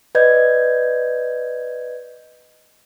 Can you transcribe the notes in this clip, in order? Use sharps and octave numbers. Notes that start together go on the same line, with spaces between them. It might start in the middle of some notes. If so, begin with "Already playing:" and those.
B4 D5 D#5 G6 G#6